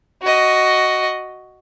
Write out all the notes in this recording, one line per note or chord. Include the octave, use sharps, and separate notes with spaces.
F#4 D#5